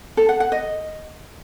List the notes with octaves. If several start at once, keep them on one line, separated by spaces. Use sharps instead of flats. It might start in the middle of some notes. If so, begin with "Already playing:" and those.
A4
F#5
F#5
D#5